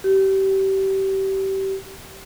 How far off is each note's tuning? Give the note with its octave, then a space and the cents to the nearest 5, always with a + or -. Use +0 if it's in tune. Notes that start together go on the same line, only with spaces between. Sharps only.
G4 -25